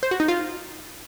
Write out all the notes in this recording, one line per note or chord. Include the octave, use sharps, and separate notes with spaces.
C5
F#4
D#4
F4